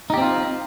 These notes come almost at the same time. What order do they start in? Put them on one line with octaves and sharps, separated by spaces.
D#4 G4 C4 F4